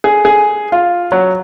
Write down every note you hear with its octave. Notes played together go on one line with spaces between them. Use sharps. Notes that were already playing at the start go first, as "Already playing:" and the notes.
G#4
G#4
F4
F#3